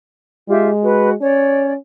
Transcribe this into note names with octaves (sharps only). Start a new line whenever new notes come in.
G#3 F4 G4 E5
F#4 B4
C#4 C#5 D5